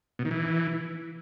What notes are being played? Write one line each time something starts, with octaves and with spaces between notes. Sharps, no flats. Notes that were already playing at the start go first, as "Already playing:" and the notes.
B2
D#3
E3